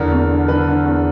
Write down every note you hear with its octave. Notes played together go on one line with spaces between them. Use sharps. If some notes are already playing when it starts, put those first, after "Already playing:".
Already playing: E2 D3 A#4
E2
D3
D3 B4
D3
E2